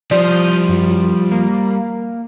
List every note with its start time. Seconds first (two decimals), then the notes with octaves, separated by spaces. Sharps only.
0.11 F3 G3 C5 D5 D#6 F6 G6
0.69 F#2
1.31 A#3